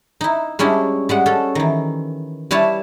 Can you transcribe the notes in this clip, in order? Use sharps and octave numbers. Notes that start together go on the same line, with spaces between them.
D#4 E4
G3 G#3 C#4 D4 E4
G3 G#3 F#5
C#4 A4
D#3 E3
G3 E4 B4 C#5 A5